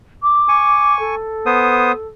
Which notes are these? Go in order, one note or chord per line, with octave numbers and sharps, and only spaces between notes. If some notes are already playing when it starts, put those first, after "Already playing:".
D6
G#5 C#6
A4
B3 C5 D#6